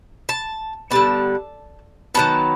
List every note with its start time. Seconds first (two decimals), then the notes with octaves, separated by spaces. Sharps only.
0.29 A5
0.91 D3 G3 B3 A5
2.15 D#3 F#3 B3 A5